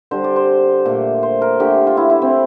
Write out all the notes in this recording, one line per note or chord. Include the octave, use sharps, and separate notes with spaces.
D3 G3 C5
D5
C5
A#2 A3
C5
A#4
D3 A3 G4
F4
E4
E4
C4